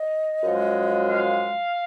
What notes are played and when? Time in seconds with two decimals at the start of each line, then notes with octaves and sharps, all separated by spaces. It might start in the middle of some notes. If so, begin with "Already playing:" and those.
Already playing: D#5
0.44 F#2 F3 G#3
1.11 F5